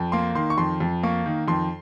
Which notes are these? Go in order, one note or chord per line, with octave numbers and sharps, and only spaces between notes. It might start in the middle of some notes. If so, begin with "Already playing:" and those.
Already playing: F2
A#3 C6
D#3 C6
C#6
F2 C6
F2
A#3 C#6
D#3
F2 C6